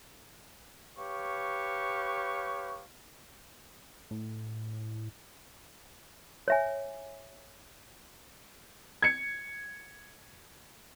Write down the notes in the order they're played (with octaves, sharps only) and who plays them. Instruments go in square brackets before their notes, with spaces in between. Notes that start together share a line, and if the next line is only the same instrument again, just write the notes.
[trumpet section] G4 B4 C#5 F5 C#6
[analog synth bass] A2
[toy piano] C#5 E5 G#5
[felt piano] G#6 C#7